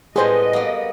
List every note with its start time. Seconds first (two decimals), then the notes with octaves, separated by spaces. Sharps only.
0.16 A2 G3 B3 G#4 B4 C5 D#5
0.53 A#3 B3